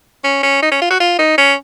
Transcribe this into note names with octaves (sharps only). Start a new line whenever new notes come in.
C#4
C#4
D#4
C#4
F4
F#4
F4
D#4
C#4